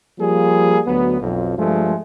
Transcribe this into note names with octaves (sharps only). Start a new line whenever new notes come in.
F3 G3 A#3 G#4
D2 F#3 B3
B1 F2
G2 F3 G#3 A3